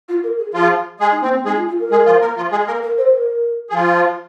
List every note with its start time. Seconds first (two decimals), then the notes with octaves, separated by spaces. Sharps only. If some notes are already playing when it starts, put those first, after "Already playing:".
0.09 F4
0.24 A#4
0.39 G#4
0.54 F3 F4 G#4
1.00 G#3 G#4
1.11 D#4
1.22 A#3 C4
1.34 C4
1.45 G#3 D#4 G#4
1.57 F4
1.68 F4
1.80 A#4
1.91 G#3 G#4
2.06 F3 F4
2.21 A#3 A#4
2.37 F3 F4
2.52 G#3 G#4
2.67 A#3 A#4
2.82 A#4
2.98 C5
3.13 A#4
3.70 G#4
3.73 F3 F4